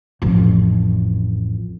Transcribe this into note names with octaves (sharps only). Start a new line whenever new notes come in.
A1 F2